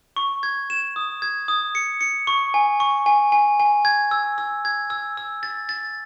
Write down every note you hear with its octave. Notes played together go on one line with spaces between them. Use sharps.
C#6
G#6
E7
D#6
G#6
D#6
C#7
C#7
C#6
G#5
C#6
G#5
G#5
G#5
G#6
E6
E6
G#6
E6
E6
A6
A6